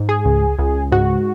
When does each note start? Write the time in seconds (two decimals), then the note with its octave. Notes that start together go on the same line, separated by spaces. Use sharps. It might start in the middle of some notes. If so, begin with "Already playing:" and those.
Already playing: G#2
0.09 G#4
0.25 C#2
0.59 C#2
0.92 G#2 F#4